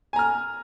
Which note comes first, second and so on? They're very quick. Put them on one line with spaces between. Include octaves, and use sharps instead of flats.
G#5 A#5 F6